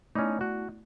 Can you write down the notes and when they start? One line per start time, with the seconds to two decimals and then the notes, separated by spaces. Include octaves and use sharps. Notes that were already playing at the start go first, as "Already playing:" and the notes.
0.15 A3 B3 C#4 D#4 E4
0.41 F#4